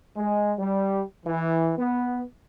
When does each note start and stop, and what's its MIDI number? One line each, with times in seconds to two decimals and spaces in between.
0.17 0.53 56
0.58 1.02 55
1.25 1.73 52
1.78 2.21 59